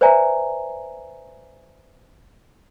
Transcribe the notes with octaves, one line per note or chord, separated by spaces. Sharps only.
B4 C5 D5 E5 G#5 A#5